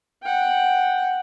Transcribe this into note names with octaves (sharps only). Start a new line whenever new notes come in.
F#5 G5